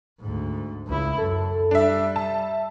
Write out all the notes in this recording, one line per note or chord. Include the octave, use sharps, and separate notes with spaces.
D2 G#2
C#2 E4
F#2 A4
G3 D4 E5
E5 A5